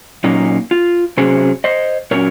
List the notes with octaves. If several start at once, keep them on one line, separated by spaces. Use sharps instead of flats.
A#2 F#3 A#3 C#4 D#4
F4
C3 F#3 C#4 G#4 C5
C5 D#5
A#2 F#3 C#4 A#4 C#5